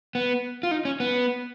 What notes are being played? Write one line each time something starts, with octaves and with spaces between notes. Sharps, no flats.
B3
F4
D#4
C#4
B3